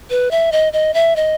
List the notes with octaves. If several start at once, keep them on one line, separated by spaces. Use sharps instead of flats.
B4
E5
D#5
D#5
E5
D#5